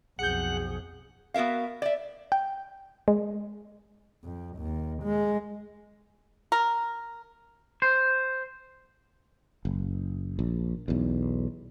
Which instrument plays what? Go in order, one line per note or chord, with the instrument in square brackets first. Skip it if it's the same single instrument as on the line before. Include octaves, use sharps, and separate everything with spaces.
[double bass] B1 F2 [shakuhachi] G#4 [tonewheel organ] F#5 [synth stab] G6 C#7
[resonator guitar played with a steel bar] B3 F#4 A#4 E5 F5
D5 E5
[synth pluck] G5
G#3
[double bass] F2
D#2
G#3
[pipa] A#4
[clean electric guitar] C5
[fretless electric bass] F#1
A#1
B1 E2